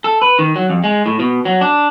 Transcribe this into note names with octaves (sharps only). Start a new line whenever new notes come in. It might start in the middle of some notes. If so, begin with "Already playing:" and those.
A4
B4
D#3
F#3
F2
G#3
A2
B2
F#3
D4